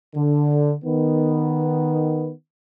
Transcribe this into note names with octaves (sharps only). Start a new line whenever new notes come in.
D3
D#3 B3